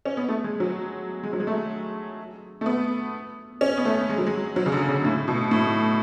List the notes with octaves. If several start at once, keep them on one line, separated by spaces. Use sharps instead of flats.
C#4
B3
A3
G#3
F#3
G#3
F#3
G#3
A3
A3
B3
C#4
B3
A3
G#3
F#3
G#3
F#3
C#3
D3
C#3
A2
B2
A2